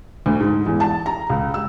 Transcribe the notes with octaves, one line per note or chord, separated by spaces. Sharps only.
D2
G#2
E2
A5
A#5
C#2
E6